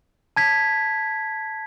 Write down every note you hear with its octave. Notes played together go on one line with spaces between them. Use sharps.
A5 G#6 B6